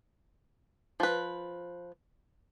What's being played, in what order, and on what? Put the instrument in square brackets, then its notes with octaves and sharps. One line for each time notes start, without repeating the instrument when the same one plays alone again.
[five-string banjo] F3 B4